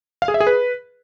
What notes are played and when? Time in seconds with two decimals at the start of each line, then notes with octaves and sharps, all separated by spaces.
0.22 F5
0.28 G#4
0.34 E5
0.40 G#4
0.47 B4